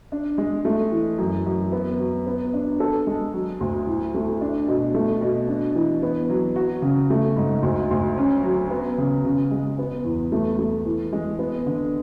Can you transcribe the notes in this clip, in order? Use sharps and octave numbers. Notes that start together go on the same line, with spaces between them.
D4
G#3
A3
E3
F#2
F#2
B3
F#3
B3
D4
A4
G#3
F#3
D2
A2
A3
D4
B2
A3
B2
D4
E3
B3
F#3
F#4
C#3
A3
G#2
D2
D2
C#4
F#3
B3
C#3
C#3
G#3
B3
E2
A3
A3
E3
G#3
B3
D3